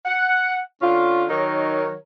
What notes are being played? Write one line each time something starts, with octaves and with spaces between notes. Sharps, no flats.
F#5
D3 C#4 F4
D#3 F#3 D#4 A#4 C#5